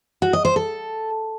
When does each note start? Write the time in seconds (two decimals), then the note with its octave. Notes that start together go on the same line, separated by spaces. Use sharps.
0.22 F#4
0.33 D#5
0.45 C5
0.56 A4